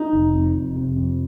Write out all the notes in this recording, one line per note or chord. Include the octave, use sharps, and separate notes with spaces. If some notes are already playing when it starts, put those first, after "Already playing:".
Already playing: D#4
F1
F2
F1
C3
F2